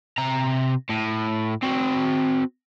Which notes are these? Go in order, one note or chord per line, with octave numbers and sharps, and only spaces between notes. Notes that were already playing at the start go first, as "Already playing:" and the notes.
C3 A#5
A2
C4 F#4